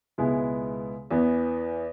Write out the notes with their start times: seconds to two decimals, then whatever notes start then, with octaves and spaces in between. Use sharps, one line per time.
0.18 C#2 B2 G#3 B3 E4
1.11 E2 E3 B3